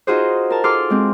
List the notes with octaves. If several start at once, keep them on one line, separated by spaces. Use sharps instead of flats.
D#4 F4 F#4 G#4 C5
A#4 A5
G#4 A4 F5 C6 D6 F6
G#3 C4